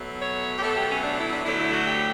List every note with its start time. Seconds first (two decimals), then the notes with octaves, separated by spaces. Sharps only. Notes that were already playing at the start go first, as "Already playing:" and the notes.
Already playing: B2 F#3 A3
0.21 C#5
0.58 G4
0.63 B2 F#3 A3 A4
0.77 G4
0.91 C#4
1.04 D4
1.19 E4
1.31 D4
1.46 D2 D3 F#3 A3 E4
1.60 E4
1.73 F#4
1.87 G4